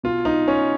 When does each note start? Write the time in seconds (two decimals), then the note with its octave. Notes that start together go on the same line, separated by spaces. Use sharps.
0.03 B2 F4
0.25 D#4
0.48 C#4